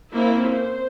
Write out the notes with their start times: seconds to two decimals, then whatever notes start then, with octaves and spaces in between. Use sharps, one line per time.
0.13 A#3 C4 C#4 E4
0.49 C5